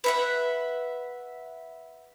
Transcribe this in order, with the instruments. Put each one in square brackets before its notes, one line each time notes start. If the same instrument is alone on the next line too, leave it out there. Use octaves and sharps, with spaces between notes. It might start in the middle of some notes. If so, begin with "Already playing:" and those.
[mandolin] B4 E5 F#5